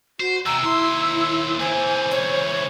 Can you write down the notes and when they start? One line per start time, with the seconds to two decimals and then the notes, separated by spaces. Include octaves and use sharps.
0.20 F#4 C5
0.46 E2 C3 A#5 E6
0.63 D#2 E4 C6
1.59 C#2 E3 C5 G#5
2.11 C#5